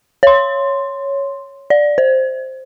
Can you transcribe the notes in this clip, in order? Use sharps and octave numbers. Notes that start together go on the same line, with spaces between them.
C#5 C6
D5
C5